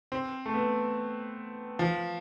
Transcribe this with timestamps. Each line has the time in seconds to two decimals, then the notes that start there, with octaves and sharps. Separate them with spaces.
0.12 C4
0.46 A3
0.54 B3
1.79 F3